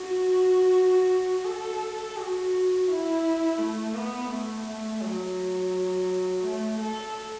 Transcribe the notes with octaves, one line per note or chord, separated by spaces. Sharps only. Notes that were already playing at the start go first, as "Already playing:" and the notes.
Already playing: F#4
A4
F#4
E4
A3
B3
A3
A3
F#3
A3
A4